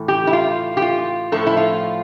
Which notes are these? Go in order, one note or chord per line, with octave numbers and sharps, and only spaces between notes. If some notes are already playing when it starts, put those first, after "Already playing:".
Already playing: A2 E3 A3
G4
E4
F4
G4
F4
A2 F3 A3 A4
E4
F4